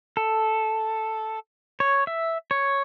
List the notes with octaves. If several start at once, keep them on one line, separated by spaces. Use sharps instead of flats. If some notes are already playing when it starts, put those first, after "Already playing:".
A4
C#5
E5
C#5